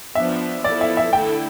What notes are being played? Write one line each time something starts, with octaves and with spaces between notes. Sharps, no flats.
F3 B3 D4 E5
F3 B3 E4 A4 D5
E5
E5
D3 A3 E4 A4 G5